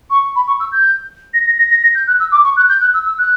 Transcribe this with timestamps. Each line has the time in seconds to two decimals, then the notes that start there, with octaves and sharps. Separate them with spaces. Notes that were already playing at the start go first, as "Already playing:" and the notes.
0.10 C#6
0.35 B5
0.47 C#6
0.60 E6
0.72 G6
1.33 A#6
1.46 A#6
1.58 A#6
1.70 A#6
1.83 A#6
1.95 G6
2.07 F#6
2.19 E6
2.32 D6
2.44 C#6
2.56 F#6
2.69 G6
2.81 F#6
2.93 E6
3.05 E6
3.18 F#6